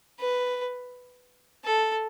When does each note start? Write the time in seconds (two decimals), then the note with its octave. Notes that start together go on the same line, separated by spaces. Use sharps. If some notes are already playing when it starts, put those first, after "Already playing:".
0.20 B4
1.65 A4